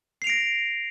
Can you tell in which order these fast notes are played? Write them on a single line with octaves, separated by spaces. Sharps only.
C7 F7 D7 A#6